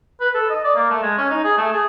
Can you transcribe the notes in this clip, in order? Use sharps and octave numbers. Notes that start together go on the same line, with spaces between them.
B4
A4
D#5
D5
A#3
A3
G#3
C#4
D#4
G#4
A3
G#4